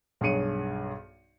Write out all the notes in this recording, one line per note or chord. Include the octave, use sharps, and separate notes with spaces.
B1 G2 G#4 C#5 C#7 D#7